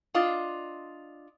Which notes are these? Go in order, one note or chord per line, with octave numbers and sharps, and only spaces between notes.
D4 F4 D#5